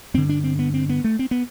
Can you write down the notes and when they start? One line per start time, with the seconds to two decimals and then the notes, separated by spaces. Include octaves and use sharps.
0.14 G2 D3 C4
0.29 D4
0.44 C4
0.59 B3
0.74 C4
0.89 B3
1.04 A3
1.19 C4
1.31 B3